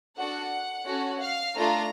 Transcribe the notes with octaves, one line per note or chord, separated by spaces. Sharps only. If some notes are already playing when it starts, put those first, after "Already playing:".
D4 F#4 A4 F#5
C#4 F#4 A4
F5
A3 D4 F4 A4 A#5